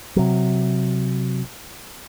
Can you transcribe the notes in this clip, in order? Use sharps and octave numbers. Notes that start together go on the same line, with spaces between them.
C3 F#3